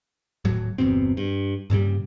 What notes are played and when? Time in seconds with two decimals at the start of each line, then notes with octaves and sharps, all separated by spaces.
0.45 D#1 A2 F#3
0.78 G1 E2 B2 C4
1.17 G2
1.70 G2 A#2 C#3 G3